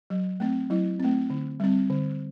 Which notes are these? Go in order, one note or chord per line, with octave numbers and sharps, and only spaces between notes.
F#3
A3 C4
F#3 E4
A3 C4
D3
G3 C4
D3